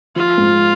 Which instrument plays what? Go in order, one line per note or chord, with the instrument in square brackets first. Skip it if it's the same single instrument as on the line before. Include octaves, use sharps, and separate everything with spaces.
[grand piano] F3 [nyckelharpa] F4
[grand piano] G#2